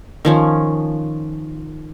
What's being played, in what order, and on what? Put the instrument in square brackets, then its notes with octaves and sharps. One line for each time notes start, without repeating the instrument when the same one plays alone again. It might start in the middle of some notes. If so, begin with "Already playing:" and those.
[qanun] D#3 F3 C#4